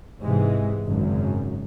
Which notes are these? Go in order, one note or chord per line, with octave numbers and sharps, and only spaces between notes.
G#2 C3 E3 G#3
G#1 F#2 C#3